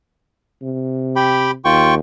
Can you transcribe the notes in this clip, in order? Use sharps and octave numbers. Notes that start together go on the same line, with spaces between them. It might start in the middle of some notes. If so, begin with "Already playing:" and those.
C3
G4 G5 B5
D#2 F4 G5 C#6